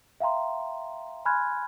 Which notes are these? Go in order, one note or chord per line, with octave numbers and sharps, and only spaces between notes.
E5 F5 G5 A#5 C6
G#5 B5 C6 F6 F#6 G#6